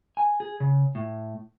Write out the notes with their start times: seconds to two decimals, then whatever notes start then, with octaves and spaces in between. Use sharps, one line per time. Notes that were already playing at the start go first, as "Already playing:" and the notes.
0.17 G#5
0.40 G#4
0.60 C#3
0.95 A2